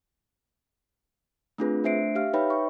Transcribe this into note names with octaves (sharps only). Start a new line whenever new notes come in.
A3 C4 D4 F4 G#4 B4
A3 D4 C5 E5 C7 D7
G4 E5 F5 F6
D#4 B4 C#5 E5 G5 B5
C#6